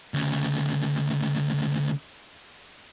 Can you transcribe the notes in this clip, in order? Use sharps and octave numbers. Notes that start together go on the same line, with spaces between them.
D2 C#3